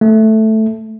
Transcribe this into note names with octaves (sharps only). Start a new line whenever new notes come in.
A3